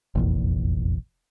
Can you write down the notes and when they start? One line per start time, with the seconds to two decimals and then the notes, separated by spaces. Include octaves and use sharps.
0.15 F1 A#1 E2